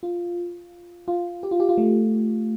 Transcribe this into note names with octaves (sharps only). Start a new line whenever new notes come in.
F4
F4
G4
F4
G4
F4
A3